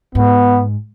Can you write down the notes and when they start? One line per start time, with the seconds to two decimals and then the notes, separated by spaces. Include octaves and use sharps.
0.15 G#2 B3